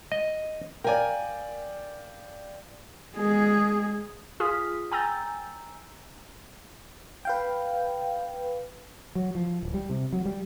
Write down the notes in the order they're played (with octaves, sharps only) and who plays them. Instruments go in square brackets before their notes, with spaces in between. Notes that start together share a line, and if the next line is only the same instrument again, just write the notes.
[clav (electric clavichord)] D#5
[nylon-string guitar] A#4 G#5 [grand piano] D5 F5 G5
[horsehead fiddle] G#3 G#4
[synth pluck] F4 G#4 D#6 F6 B6
G5 G#5 A#5 E6 G6 A6
[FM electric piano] B4 F5 G5
[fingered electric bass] F#3
F3
D1
G3
C3
F#3
G3